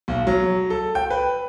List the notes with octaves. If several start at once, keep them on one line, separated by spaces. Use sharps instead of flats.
B1
F#3
A4
G5
B4